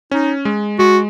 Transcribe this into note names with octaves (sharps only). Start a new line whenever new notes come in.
C#4 D#4
G#3
G#3 F#4